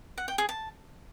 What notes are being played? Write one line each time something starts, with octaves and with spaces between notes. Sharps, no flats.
F#5
G5
G#4
A5